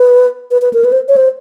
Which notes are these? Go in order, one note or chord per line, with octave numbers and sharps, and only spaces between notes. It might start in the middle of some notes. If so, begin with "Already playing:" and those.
Already playing: B4
B4
B4
A#4
B4
C5
C#5
C5